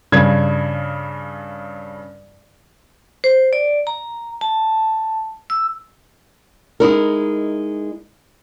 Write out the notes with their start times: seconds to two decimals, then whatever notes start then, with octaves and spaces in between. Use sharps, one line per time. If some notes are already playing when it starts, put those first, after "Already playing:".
0.12 G2 C#3 G#6
3.24 C5
3.53 D5
3.87 A#5
4.41 A5
5.50 E6
6.80 G#3 D#4 E4 A#4